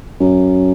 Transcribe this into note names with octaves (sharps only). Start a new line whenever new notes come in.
F#2